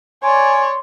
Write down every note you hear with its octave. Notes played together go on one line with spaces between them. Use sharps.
C#5 D5 G#5 C6